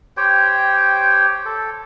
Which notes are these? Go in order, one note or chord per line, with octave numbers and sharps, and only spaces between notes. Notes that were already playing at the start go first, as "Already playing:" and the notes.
G4 C5 C#5 G5
A4